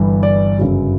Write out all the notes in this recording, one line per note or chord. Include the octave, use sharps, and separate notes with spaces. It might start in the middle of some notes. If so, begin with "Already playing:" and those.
Already playing: G1 G2 E3
D5
G1 F#2 C#3 F#3